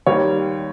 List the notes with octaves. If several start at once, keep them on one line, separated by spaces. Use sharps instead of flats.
D#2 D#3 G3 C#5